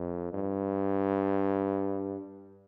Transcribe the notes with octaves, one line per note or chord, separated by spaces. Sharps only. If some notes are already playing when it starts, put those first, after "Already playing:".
Already playing: F2
G2